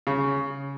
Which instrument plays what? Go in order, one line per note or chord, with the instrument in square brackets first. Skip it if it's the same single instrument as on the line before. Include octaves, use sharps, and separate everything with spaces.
[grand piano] C#3